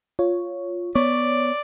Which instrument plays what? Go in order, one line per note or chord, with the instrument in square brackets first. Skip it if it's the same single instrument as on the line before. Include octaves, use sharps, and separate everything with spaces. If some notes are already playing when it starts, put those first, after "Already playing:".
[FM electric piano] F4 C#5
[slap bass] B3 [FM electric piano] C#5 [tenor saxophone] D5